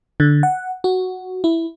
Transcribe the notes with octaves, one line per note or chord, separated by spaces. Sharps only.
D3
F#5
F#4
E4